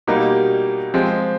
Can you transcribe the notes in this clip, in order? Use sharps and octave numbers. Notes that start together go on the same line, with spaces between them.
B2 G3 A#3 D#4
F3 G#3 C4